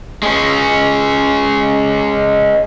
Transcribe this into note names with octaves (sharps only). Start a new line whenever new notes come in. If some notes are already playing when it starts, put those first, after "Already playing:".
G#3 C#4